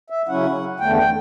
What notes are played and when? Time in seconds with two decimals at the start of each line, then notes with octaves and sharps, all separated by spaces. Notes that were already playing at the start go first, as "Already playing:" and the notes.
0.10 E5
0.28 C#3 F#3 C#4 E4 F#5
0.80 E2 D3 A3 G5
0.98 G5